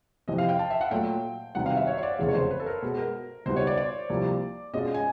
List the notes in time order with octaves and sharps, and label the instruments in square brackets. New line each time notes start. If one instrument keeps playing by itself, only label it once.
[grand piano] F2 C3 E3 [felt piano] D#5
[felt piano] F5
G5
A5
E5
F#5
[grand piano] A#2 F#3 A3 [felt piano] G5
[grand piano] E1 E2 C3 D#3 G3 [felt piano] F#5
[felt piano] F5
E5
C#5
C#5
D5
[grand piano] F1 E2 C#3 E3 G#3
[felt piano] C#5
C5
B4
A4
A#4
[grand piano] B2 G#3 B3
[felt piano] A#4
[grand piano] C#2 B2 G3 B3 D#4 [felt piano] C5
[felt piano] C#5
D5
D5
[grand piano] C2 C3 F3 A#3
[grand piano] B2 G#3 C#4 F4 [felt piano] D#5
[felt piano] G#5